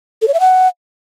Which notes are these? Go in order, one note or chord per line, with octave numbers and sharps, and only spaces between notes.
A4
C#5
E5
F#5